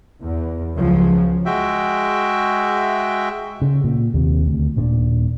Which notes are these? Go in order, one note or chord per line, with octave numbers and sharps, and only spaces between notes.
E2
C#2 C#3 F3 F#3
G#3 F#4 E5 G5
C#3
A#2
D#2 C3
D2
D#1 A#2 D4